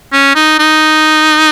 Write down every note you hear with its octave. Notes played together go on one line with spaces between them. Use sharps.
C#4
D#4
D#4